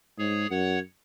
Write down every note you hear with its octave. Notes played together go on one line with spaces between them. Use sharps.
G#2 G#4 C#5
F#2 C#5 F#5